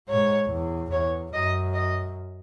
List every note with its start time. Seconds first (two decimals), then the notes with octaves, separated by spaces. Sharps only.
0.09 G#2 C#5
0.51 E2
0.92 E2 C#5
1.33 F#2 D#5
1.74 D#5